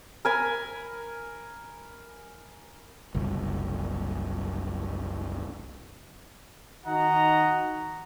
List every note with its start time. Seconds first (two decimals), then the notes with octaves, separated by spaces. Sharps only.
0.25 A#4 G#5 B5
3.14 F#1 C2
6.87 D#3 D#4 F#4 D#5 F#5 A#5